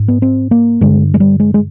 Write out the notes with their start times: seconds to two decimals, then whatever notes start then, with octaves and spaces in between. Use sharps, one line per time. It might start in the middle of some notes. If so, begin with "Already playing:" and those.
Already playing: G#2
0.08 B3
0.22 C4
0.51 A#3
0.81 G2 D3 G#3
1.14 G#3
1.20 G3
1.40 G#3
1.54 G#3